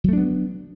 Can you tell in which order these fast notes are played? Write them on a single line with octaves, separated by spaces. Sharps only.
F#3 A3 D4 B3